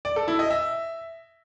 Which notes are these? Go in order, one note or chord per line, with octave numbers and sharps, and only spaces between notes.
D5
A4
E4
D#5
E5